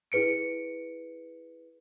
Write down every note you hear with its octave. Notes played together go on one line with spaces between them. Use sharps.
E4 G#4 B4 C#7 D7